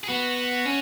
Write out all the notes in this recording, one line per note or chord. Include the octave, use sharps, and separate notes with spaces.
G#4
B3 F#4
C#4